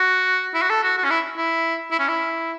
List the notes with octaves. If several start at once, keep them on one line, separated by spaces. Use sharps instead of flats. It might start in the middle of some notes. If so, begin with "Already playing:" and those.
Already playing: F#4
E4
F#4
A4
F#4
F#4
C#4
E4
E4
E4
C#4
E4